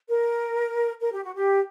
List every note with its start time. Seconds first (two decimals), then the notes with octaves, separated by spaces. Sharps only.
0.08 A#4
1.02 A#4
1.12 G4
1.22 F#4
1.34 G4